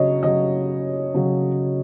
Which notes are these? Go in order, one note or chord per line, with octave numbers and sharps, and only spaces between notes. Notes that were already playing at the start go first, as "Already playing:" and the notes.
Already playing: C#3 F#3 C#5 D#5
C#3 F#3 D#5
C#3 F#3